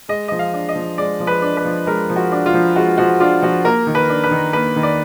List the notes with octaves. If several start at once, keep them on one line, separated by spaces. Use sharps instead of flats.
G#3 D#5
F3 D#5
F5
D4
D#5
F3
G#3 D5
F3
B4
D4
B4
F3
G#3 A#4
F3
F#4
D4
F4
F3
G#3 F#4
F3 F#4
D4 F4
F3 F#4
A#3 A#4
D#3
B4
D4
B4
D#3
A#3 B4
D#3
D5